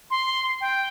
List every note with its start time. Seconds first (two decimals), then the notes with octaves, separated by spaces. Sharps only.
0.11 C6
0.61 G5